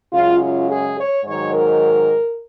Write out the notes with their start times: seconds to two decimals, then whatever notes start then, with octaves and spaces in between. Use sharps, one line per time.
0.13 F#2 C#3 G#3 F4
0.42 F4
0.69 G#4
0.98 C#5
1.25 G#2 D#3 F#3 C#5
1.53 A#4